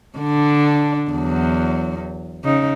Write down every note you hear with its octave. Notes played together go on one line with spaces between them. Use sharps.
D3 D4
E2 F#3
C#3 D#4